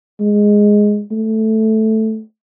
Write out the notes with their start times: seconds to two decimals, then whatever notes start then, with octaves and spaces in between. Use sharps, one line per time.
0.20 G#3
1.11 A3